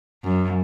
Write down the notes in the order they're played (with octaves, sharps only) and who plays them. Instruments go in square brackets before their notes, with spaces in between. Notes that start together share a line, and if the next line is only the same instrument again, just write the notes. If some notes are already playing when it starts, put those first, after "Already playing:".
[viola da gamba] F#2